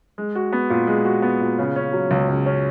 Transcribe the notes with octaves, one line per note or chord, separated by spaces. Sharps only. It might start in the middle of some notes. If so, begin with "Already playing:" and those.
G#3
F#4
B3
A#2
G#3
F#4
B3
A#2
C#3
C#4
F#3
C#2
C#3
C#4